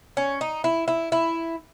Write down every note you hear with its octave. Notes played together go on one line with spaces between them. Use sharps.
C#4
D#4
E4
E4
E4